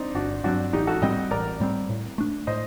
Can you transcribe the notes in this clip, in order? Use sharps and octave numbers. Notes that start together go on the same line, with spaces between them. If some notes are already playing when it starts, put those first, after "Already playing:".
Already playing: C4 D4 D#4
G1 D4 F#4
G2 F#3 C4 D4 F#4
A1 D#4 G4
F#4 A4
A2 G3 C4 D#5 G5
A1 A#4 D5
A2 G3 C4
A2
A3 D4
A2 C5 D#5